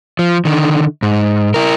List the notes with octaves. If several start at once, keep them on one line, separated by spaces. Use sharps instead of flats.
F3
D3 D#3
G#2
E4 A#4